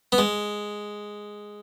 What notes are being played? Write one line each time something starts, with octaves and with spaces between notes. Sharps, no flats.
B3
G#3